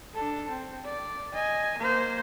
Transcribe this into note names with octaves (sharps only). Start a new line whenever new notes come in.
D4 A4
C4
D5
D#5 G#5
A#3 C5